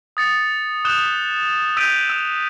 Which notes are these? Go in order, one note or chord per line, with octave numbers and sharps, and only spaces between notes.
D#6 A6 C#7
D#6 F#6 G6 E7 G7
E6 G6 B6 D7 D#7 F7
E6 F7